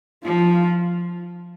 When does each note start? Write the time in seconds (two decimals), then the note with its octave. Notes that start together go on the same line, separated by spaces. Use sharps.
0.24 F3 F4